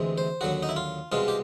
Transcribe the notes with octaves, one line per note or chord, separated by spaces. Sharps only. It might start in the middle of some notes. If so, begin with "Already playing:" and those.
Already playing: D2 C3 E3 G#3 C4
C5
D#2 D3 F#3 F#4
D#4
E4
F4
C2 B2 G#3 F4
G4